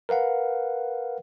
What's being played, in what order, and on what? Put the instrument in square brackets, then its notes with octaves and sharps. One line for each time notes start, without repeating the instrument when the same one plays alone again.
[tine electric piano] A#4 B4 F5 F#5